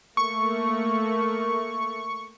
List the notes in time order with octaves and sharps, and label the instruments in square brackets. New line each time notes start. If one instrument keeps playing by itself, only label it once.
[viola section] A3 A#3 [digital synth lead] C#6